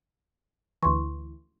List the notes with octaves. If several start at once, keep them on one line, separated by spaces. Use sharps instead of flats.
D2 E3 C6 C#6